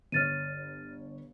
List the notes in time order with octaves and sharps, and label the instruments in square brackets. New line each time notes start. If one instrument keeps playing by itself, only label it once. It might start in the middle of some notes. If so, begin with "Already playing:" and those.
[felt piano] G1 C#5 [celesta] F6 A6 D#7